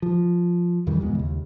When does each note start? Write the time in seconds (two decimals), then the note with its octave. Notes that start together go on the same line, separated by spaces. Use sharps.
0.02 F3
0.87 F2 D#3 E3 G3
1.01 D#1 E2 G#3
1.15 D#2 C#3